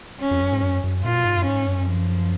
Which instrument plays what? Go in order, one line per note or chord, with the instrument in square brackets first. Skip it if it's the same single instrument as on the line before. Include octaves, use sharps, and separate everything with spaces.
[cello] C#4
[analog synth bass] F2
F#2
G#2
F#2
F#2
[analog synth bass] A#2 [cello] F4
[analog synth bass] B2
G#2
F#2
[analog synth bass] G#2 [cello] C#4
[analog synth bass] F#2
[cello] F3